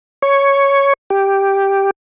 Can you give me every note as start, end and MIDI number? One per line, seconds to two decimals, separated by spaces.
0.22 0.93 73
1.10 1.90 67